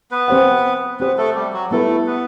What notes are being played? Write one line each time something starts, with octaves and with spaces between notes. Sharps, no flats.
B3 B4
C4 G4 C5 F#5
B3 C4 G4 B4 C5 F#5
A3 A4
G3 G4
F#3 F#4
G3 A3 B3 E4 A4 B4
B3 B4